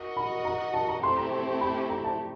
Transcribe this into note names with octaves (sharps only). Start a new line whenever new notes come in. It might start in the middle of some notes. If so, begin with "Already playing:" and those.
Already playing: F#4 A#4 D#5 F#5
B5
A#5
A5
A#5
A3 C4 E4 G4 C6
A#5
B5
A#5
A5